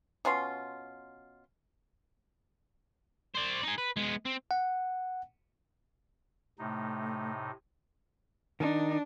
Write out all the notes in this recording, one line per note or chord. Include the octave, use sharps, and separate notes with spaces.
B2 C#4 F4 C6
C5 D5
D#4 G#4
B4
G#3 B3
C4
F#5
A2 C3 A3 D#4
D#3 D4 D#4